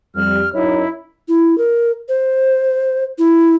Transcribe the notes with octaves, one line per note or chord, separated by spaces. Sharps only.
F2 G3 F6
F#2 D#4 E4 C#5
E4
A#4
C5
E4